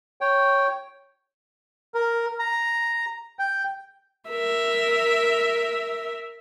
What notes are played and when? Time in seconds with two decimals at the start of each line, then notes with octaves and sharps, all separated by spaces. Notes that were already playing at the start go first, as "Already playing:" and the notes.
0.21 C#5 G5
1.94 A#4
2.39 A#5
3.39 G5
4.30 A#4 E5